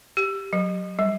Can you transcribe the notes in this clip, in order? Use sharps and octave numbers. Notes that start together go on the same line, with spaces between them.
G4
F#3
G3